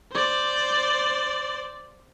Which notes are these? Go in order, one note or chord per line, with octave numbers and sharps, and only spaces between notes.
C5 D5